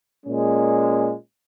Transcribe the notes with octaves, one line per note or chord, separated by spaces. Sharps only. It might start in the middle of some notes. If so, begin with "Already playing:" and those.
A#2 G#3 C#4